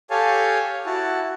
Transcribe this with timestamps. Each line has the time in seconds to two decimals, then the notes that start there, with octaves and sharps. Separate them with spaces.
0.10 G4 A4 C#5 F5 G#5 A5
0.86 E4 F#4 A5